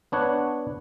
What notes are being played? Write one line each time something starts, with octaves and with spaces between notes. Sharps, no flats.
B3 D4 C#5 F#5